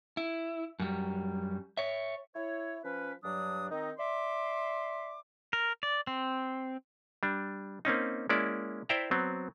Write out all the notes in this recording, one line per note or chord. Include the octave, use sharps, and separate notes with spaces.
E4
F#2 G3
C#5 E5
E4 C#5
F3 C#4 B4
G2 F#3 D4 D#6
D#3 C4 D#4
D5 E5 C6 D6
A#4
D5
C4
G3 D4
A#3 C4 C#4 D#4
G#3 A#3 C#4 E4 D5
E4 C5 D5 E5 G5 A#5
F#3 B3 C4